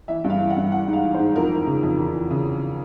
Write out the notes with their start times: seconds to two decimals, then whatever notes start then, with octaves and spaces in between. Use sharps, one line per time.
0.08 E3 E5
0.24 G2
0.30 F5
0.40 E3
0.50 F#5
0.56 G2
0.72 E3 F#5
0.88 G#2
0.93 F5
1.04 E3
1.14 G#2 C5
1.36 F2 A#4
1.51 E3
1.67 C#3
1.83 F2
1.99 E2
2.14 E3
2.30 C#3